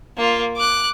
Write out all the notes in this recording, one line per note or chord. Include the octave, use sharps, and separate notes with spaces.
A#3 F4
D6 F#6